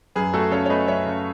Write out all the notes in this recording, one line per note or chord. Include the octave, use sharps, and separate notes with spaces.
F#2 G#4 B4
A3 F#4 A4
C#3 A4 C#5
C#5
A3 B4 D#5
F#2 C#5 E5
C#3